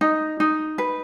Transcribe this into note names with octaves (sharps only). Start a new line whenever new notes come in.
D#4
D#4
B4